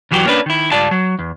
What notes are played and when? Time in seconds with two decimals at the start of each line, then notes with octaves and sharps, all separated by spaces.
0.11 E2 E3 F#3 F#4 G4
0.25 A#3 C#4 D4 B4
0.46 D#3 E4
0.72 C#2 G2 G3 F4 D5 A5
0.91 F#3
1.19 E2